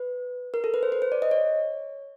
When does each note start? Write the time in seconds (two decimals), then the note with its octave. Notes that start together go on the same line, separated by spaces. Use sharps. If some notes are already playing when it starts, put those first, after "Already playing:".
Already playing: B4
0.54 A#4
0.64 A4
0.74 B4
0.83 C5
0.92 B4
1.02 C5
1.12 D5
1.22 D#5
1.31 C#5